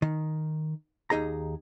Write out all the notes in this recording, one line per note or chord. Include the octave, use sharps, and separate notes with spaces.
D#3
D#2 D#4 G#4 A#5